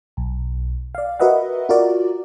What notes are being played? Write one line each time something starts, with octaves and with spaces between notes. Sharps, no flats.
B1
D5 F5
F#4 A#4 B4 D#5 E5 F#5
F4 F#4 A#4 D5